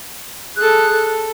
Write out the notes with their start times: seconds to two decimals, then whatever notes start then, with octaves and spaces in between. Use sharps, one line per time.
0.57 G#4 A4 F#6
0.92 A4